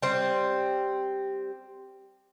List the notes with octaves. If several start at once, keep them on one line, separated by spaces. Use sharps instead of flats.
G3 C4